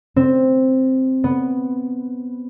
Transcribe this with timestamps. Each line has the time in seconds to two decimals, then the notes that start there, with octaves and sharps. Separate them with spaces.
0.16 C4
1.24 B3